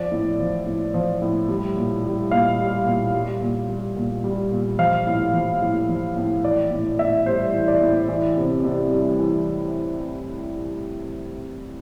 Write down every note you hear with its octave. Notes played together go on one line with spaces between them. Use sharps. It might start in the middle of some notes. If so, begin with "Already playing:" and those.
Already playing: F3 D5
A2
F3
A2
F3
A2
G3
A#2
G3
A#2 F5
G3
A#2
G3
A#2
G3
A#2
G3
A#2
F3 F5
A2
F3
A2
F3
A2
E3 D5
A2
A2 E5
G3 C5
E3
D5
A2
E3
C3
C3
G3
E3